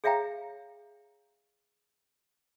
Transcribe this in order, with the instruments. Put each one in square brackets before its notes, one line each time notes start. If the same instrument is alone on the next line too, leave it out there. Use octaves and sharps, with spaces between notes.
[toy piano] G#4 C#5 E5 F5 G5 A#5